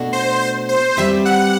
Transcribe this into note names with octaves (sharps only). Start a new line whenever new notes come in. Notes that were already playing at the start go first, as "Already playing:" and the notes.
Already playing: B2 A3 D4 F#4 A4
C5
C5
C5
G3 C4 G4 B4 E5
F#5